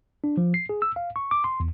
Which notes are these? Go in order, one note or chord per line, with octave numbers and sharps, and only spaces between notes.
D4
F3
C7
G#4
E6
F5
C#6
D6
C6
E2